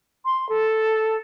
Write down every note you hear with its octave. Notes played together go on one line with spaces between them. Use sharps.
C6
A4